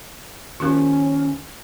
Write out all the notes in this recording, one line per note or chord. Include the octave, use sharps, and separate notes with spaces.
D#2 F3 C#4 E4 G4 A#4